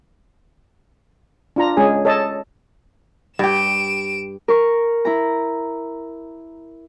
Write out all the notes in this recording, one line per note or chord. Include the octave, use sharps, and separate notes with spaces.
D4 F4 A#5
G#3 C#4 G#4 G#5
A4 C#5 D#5 A5
G2 G4 D7 E7
A#4 C#6
E4 A#5